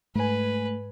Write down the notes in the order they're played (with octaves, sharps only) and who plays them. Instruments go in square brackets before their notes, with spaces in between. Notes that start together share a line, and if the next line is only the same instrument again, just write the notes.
[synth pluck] G#2 G#5 [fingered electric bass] A3 [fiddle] B4